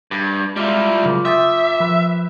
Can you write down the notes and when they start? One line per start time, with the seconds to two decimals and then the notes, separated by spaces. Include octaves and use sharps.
0.11 G2 B4 A5
0.56 G3 G#3 E4 F4 F5 A#5
1.04 C#3 F#3 A#3
1.25 E5 G5 C6 D#6 A6
1.80 F3 B4